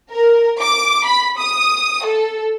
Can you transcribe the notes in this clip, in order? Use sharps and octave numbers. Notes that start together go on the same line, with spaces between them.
A#4
D6
B5
D#6
A4